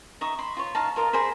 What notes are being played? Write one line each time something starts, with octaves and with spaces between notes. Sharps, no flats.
D#4 E5 C#6 D#6
B5 C6
F4 C#5
D#4 F5 A5
F4 A#4 D#5
G#4 A#4 C5 B5